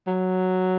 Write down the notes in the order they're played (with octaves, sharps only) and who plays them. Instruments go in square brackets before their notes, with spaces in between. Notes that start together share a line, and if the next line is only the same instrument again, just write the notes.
[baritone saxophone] F#3